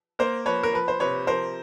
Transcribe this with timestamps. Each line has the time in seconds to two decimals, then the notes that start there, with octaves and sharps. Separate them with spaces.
0.19 A#3 A#4 C5
0.46 F3 B4 C#5
0.63 A#4
0.73 F3 B4
0.88 C5
1.00 C3 B4 C#5
1.27 F3 A#4 C5